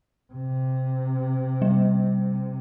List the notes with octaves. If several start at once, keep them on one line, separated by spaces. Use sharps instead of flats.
C3
G3